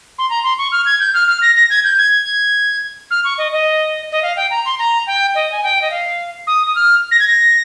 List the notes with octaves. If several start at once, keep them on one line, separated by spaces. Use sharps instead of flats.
C6
A#5
C6
C#6
F6
G#6
G6
F6
F6
A#6
A#6
G#6
G6
G#6
F6
C#6
D#5
D#5
D#5
F5
G5
A#5
C6
A#5
G5
D#5
G#5
G5
D#5
F5
D#6
D#6
F6
A#6
G#6
A#6